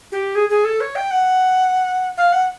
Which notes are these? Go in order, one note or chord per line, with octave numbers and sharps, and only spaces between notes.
G4
G#4
G#4
A4
C#5
G5
F#5
F5
F#5